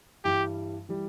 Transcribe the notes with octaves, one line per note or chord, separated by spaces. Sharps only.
G2 E3 G3 G4
E3 G3